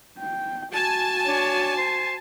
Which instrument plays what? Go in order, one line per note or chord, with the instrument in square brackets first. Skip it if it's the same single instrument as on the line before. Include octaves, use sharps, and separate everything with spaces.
[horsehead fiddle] G5
[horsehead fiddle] F#4 [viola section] G#5 A5
[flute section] D4 C#5
C5